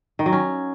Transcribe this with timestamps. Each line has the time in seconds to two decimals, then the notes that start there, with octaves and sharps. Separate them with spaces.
0.19 D#3
0.26 F#3
0.33 C#4